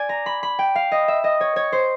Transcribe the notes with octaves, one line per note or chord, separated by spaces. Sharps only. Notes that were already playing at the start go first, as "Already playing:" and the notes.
Already playing: D5 G#5
A#5
B5
B5
G5
F5
D#5
E5
D#5
C#5
C#5
C5